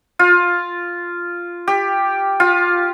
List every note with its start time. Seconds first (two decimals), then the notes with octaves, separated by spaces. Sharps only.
0.19 F4
1.68 G4
2.40 F4